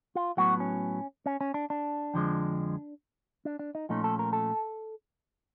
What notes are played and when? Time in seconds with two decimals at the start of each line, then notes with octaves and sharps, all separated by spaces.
0.15 F4
0.37 A2 F#3 B3 F#4
0.60 C#4
1.26 C#4
1.41 C#4
1.54 D4
1.70 D4
2.14 F2 D3 F3 G#3
3.45 D4
3.59 D4
3.75 D#4
3.89 A#2 F3 A3 C#4 D#4
4.04 A4
4.19 A#4
4.33 A4